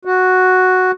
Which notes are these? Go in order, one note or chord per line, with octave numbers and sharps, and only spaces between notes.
F#4